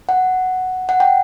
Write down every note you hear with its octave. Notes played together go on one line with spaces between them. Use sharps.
F#5
F#5
G5